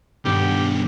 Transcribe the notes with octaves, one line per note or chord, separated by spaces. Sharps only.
B1 G2 D#3 G3 B3 G4